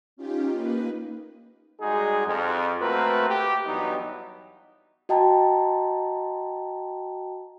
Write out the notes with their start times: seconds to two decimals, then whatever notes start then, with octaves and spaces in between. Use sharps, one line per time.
0.17 C#4 D#4 F4 G4
0.50 A#3 D#4 B4
1.81 G3 G#3 D#4 F#4 G#4
2.26 F2
2.80 A3 A#3 C4 F#4 A#4 B4
3.29 G4
3.66 G2 E3 F#3 B3 D#4
5.09 F#4 D#5 G5 A5 A#5